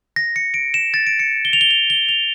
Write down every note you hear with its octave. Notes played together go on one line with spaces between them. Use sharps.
A#6
C#7
D7
E7
A6
D7
C#7
G7
F7
G7
F7
G7
F7